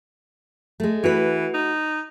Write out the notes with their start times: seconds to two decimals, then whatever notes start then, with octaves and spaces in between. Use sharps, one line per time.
0.80 G#3 A3
1.04 E3 F#4 B4
1.54 D#4